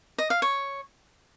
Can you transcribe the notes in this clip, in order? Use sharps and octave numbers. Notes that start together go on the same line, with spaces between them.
D#5
F5
C#5